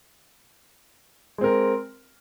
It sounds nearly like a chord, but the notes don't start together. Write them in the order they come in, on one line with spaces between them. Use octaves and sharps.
G#3 C4 A#4